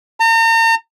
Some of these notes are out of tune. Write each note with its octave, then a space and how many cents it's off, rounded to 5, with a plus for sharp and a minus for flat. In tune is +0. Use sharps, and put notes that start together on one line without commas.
A#5 -40